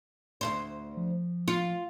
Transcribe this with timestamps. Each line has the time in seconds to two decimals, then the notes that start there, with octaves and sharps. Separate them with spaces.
0.41 D2 A#2 C5
0.97 F3
1.48 F4